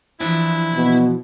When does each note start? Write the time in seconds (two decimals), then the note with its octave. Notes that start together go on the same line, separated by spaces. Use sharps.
0.20 E3 F3 D4 E4
0.74 B2